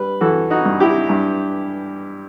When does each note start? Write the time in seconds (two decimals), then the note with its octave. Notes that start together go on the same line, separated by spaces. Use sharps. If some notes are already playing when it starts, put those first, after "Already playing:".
Already playing: G2 G3 B4
0.21 E3 F#4 A4
0.50 D#4 F#4
0.65 G2
0.80 E4 G4
1.09 G2